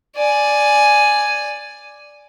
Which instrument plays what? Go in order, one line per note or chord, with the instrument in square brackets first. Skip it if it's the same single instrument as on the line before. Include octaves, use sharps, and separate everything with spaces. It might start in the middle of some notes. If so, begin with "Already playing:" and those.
[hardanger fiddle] D5 G#5